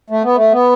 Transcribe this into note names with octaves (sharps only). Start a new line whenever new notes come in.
A3
B3
A3
B3